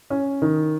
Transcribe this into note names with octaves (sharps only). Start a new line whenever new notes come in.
C#4
D#3